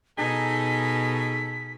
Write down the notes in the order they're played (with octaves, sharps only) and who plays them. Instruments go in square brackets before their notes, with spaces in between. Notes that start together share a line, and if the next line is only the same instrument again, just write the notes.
[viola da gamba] B2 [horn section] D#4 G#4 A4 [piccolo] B6